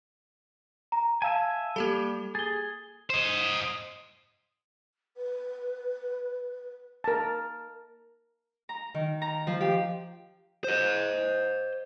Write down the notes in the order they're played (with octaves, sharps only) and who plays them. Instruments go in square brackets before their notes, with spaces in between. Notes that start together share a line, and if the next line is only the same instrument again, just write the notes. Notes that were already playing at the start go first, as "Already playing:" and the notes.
[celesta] A#5
[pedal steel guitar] E5 G#5 [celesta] F5 A5
[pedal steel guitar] G3 [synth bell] A#3 G4 A4
[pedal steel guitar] G#4 [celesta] A6 G7
[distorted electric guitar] C5 D#5
[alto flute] B4
[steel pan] A#4 A5
[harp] A#5
D#3
A#5
F3
G4
[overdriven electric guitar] C5 D#5